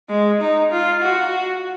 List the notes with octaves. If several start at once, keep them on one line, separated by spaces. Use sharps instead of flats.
G#3
D#4
F4
F#4